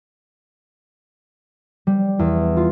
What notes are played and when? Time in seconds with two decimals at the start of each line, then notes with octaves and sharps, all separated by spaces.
1.87 G3
2.19 E2
2.57 F4